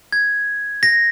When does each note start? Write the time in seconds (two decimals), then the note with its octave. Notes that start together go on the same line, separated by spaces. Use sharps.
0.12 G#6
0.83 A#6